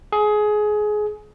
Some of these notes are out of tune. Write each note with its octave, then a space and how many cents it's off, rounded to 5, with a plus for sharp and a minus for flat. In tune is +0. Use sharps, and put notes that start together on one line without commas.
G#4 +20